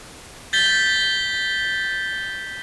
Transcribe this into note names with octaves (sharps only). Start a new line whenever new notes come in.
G6 A6 B6 G7